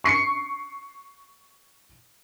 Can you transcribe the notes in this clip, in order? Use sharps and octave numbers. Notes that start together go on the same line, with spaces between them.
C#6 C7 C#7